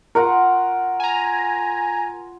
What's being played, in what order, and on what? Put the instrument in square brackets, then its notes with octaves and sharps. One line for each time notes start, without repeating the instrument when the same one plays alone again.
[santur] F4 F#5 C#6 [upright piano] A#4
[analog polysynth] G#5 A#5